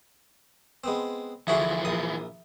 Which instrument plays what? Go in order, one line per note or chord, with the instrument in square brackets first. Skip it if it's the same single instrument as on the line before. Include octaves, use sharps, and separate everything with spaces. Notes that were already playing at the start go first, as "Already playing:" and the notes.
[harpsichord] G#3 B3 C4
[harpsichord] D2 F#4 G#4 [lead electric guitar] E3 F3 [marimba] E5
[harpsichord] A#1 D#6